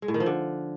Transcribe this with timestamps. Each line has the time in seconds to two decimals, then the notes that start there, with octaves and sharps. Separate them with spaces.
0.02 G#3
0.08 A2
0.14 D#3
0.20 F3
0.26 D3